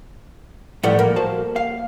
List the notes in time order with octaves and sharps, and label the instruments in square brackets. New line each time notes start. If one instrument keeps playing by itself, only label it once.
[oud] A2 E3 G3 [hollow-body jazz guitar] F3 F#5
[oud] A#3
[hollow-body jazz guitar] F#4 C5 A5
F5